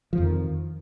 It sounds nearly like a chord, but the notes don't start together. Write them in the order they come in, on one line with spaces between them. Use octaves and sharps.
F3 F2 D#3